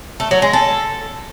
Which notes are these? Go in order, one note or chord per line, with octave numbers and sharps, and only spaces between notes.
A3
F#3
G#3
A4